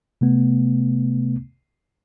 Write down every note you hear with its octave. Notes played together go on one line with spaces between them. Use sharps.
C3 A3 B3